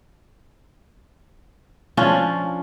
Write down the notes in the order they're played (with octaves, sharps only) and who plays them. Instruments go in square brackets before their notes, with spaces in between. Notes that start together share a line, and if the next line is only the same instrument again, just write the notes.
[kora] F3 C#4 D4 F4